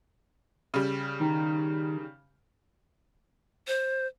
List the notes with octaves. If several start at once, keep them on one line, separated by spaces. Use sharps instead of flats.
C#3 G3
D#3
C5